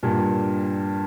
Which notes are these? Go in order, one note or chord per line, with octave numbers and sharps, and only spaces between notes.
G2 A#2